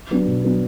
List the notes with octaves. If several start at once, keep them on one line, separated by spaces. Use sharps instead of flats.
F#3 B3 D4
B2
F#3 B3 D4